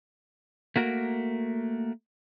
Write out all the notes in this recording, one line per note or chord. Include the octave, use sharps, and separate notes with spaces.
A3 A#3 F#4 A#4